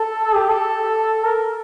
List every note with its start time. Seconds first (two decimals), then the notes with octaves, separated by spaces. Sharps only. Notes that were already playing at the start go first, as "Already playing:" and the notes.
Already playing: A4
0.35 G4
0.49 A4
1.24 A#4